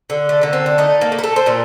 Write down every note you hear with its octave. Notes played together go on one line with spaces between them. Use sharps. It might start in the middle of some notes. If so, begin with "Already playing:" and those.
D3
A3
D3 A#3
C4
D4
A3 D#4
A#3
A3
A#4
A4
C5
A#2 A#4